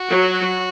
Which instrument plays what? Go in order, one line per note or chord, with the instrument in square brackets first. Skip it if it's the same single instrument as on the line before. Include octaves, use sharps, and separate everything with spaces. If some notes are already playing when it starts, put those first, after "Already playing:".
Already playing: [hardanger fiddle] F#4
[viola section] F#3